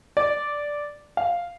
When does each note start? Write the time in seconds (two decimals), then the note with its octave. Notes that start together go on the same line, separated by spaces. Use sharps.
0.17 D5
1.17 F5